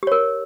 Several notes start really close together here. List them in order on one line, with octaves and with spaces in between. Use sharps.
G4 C#5 A#4